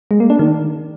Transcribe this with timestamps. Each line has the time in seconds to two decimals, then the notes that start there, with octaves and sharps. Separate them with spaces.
0.11 G#3
0.20 A#3
0.30 D4
0.39 D#3